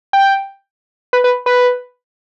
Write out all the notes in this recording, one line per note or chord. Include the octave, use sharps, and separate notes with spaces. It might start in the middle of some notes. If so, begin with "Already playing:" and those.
G5
B4
B4
B4